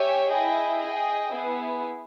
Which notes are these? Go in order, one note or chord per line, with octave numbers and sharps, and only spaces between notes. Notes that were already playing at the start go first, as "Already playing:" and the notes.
Already playing: G4 C#5 E5 G#5
E4 G#4 D#5 G5
G#4 D#5 G5
B3 E4 G#4